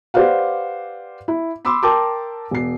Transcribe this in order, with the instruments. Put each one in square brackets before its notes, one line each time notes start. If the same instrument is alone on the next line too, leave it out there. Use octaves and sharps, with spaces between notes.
[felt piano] G4 B4 C5 D5 F5 F#5
E4
B5 C6 D6 E6
A#4 G5 A5 C6 D6
E1 C7